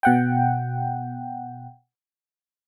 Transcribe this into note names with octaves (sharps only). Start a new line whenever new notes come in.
B2 F#5 G5